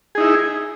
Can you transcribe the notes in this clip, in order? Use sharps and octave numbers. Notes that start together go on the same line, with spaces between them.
D#4 E4 G#4